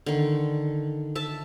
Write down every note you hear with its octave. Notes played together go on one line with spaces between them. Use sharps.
D3 D#3
E5 A5